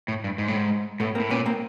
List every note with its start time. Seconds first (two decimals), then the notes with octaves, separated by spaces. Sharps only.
0.08 A2
0.24 G2
0.38 G#2
0.48 A2
0.56 G#2
1.00 A2 A3 B3
1.15 A#3 C4
1.20 A2
1.30 A#2 B3 C#4
1.46 A#3 C4